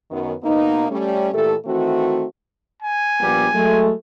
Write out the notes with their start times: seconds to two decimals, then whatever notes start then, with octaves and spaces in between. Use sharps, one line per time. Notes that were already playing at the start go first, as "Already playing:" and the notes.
0.11 F#2 D#3 B3
0.43 B2 A#3 B3 D#4
0.89 G3 A3 C#4
1.33 A#2 E3 A3 G4 A4
1.65 D#3 E3 A3 C4 F#4
2.82 G#5
3.20 A#1 G3 B3
3.54 F#3 G#3 A3